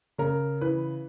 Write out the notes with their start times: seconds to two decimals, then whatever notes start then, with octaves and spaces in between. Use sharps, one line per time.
0.18 C#3 A#4
0.61 E3 B4